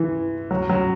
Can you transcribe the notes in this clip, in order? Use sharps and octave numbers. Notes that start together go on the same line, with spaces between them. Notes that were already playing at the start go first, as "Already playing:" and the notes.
Already playing: E3
F#3
F#3